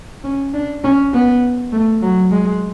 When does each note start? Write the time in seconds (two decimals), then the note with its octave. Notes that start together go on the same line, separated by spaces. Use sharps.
0.24 C#4
0.54 D4
0.84 C#4
1.14 B3
1.73 A3
2.03 F#3
2.31 G#3